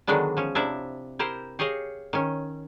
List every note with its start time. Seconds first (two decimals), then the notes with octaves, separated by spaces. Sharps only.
0.07 D3 D#3 F#3 G#3 B3 D4
0.37 F3 C#4
0.55 C3 F3 D4 E4 E5
1.19 E4 G4 A#4 C5
1.59 G4 G#4 C#5 D#5 F5
2.13 D#3 C#4